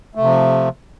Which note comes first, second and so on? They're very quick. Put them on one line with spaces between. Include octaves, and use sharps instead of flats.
A3 C3 F3